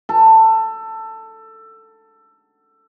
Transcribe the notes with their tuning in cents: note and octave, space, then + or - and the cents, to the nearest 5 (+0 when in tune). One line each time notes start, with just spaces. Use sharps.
A4 +15